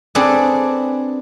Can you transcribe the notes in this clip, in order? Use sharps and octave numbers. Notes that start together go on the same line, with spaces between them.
C4 D4 G#4 A4 B4